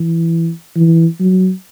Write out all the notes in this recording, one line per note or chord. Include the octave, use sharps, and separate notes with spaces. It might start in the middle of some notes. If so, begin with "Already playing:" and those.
Already playing: E3
E3
F#3